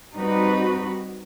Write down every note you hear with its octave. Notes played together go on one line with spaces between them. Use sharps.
G3 C4 D#4 F#4 B4